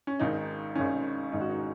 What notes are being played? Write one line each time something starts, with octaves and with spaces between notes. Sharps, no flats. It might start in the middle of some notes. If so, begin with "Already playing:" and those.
C#4
G#1 G#2 D#3 D#4
G#1 G#2 D#3 C#4
G#1 G#2 D#3 D#4
F#4
D#4